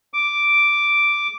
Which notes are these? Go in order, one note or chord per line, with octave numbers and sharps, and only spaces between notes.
D6